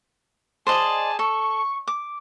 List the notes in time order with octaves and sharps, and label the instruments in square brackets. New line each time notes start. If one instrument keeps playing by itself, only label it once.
[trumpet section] G#4 G#5 A5 [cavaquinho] C5 D5 D#5
[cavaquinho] A4 [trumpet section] C#6
[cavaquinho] D6